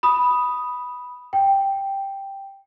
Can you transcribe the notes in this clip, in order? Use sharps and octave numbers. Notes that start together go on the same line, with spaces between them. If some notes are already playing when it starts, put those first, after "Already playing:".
B5 D#6
G5